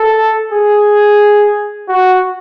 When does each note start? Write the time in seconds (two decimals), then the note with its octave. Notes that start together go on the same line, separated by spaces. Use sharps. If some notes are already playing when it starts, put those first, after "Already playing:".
Already playing: A4
0.52 G#4
1.88 F#4